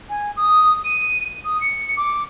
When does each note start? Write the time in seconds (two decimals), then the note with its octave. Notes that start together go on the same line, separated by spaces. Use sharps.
0.10 G#5
0.37 D#6
0.85 D#7
1.45 D#6
1.61 C#7
1.97 D6